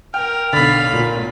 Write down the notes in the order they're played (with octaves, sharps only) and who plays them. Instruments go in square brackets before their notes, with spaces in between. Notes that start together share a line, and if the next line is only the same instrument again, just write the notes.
[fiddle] A#4 [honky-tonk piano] G5 [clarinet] F6
[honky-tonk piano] B1 A6 [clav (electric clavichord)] D3 [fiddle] F5 B5
[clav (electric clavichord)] A#2